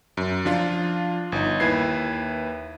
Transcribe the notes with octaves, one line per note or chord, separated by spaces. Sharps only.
F#2
F3 D4 F4
G1 D#4
D#2 E4 B4 G#6 C7